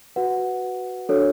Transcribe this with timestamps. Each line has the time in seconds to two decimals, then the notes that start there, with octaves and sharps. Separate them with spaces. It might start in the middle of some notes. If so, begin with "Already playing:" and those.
0.16 F#4 B4 F#5
1.09 D4 F#4 A4 C#5